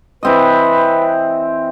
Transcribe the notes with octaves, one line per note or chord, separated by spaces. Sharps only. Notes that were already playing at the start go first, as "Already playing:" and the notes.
E3 C4 B4 D#5